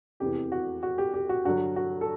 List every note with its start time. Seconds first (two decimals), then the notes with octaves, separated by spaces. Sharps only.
0.20 F1 E2 C3 E3 G4
0.52 F#4
0.83 F#4
0.98 G4
1.14 G4
1.29 F#4
1.45 G2 D3 F#3 F#4
1.76 F#4
2.01 A4